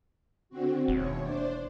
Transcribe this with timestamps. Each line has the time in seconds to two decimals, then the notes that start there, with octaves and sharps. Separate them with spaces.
0.49 D3 C4 F#4
0.88 E1 D#2 C#5
1.20 D4 C5 D5